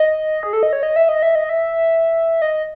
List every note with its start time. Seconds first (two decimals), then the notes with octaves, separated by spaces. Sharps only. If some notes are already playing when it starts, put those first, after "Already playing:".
Already playing: D#5
0.43 G#4
0.53 A4
0.63 D#5
0.73 C#5
0.83 D#5
0.96 E5
1.09 D#5
1.23 E5
1.35 D#5
1.49 E5
2.42 D#5